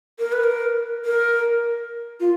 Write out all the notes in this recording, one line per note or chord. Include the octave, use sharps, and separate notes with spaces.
A#4
B4
A#4
A#4
F4